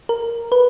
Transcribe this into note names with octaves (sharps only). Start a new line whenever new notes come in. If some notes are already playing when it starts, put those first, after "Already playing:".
A#4
B4